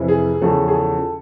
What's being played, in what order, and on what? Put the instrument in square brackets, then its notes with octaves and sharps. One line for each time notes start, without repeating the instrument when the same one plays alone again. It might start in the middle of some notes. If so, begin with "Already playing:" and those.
Already playing: [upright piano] F2 C3 E3
G#4
E2 C#3 F3 A4
G#4
A4